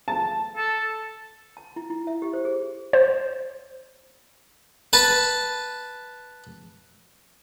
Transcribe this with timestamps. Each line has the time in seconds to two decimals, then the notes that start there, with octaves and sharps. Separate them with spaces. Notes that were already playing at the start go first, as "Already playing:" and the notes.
0.08 A5
0.57 A4
1.57 A5
1.76 E4
1.90 E4
2.07 E5
2.22 G4
2.33 C5
2.45 G#4
2.93 C5
4.93 B4 A5